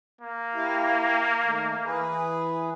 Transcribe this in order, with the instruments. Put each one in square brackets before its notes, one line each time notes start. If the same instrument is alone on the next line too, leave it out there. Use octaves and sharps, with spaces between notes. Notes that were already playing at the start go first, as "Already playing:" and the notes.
[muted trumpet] A#3
[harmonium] E4 G4 F5
D#3 A3
E3 G#4 B4